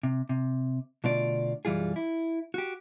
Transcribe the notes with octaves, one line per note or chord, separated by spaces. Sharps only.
C3
C3
B2 D3 A3 F4 D5
B1 F#2 E3 G3 F4 G#4
E4
F#4 G4